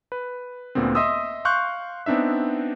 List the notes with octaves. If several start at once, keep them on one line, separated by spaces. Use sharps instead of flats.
B4
D2 A#2 D3 B3 C4
D#5 E5 C6 D#6 E6
F5 C6 C#6 F#6 G6
B3 C4 D4 D#4 E5